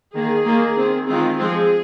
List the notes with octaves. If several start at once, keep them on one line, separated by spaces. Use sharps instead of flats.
D#3 A#3 G#4
D#3 A#3
D#3 C4
D#3 G#3 C4 F4
F3 G#3 C4 G#4